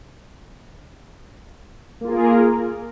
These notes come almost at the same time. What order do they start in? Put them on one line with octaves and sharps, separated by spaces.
A#3 F4 G#4 A#4